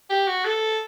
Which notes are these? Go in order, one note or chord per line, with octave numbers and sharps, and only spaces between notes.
G4
F#4
A4